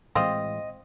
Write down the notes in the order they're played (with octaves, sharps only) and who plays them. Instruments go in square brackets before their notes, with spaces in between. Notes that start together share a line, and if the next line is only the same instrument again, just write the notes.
[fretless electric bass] A2 E3 G#3 [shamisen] C4 F4 [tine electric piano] D#5 D#6